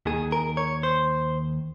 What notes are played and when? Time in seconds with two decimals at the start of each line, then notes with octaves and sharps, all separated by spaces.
0.06 D#2 D#3 G#4
0.32 A#4
0.57 C#5
0.83 C5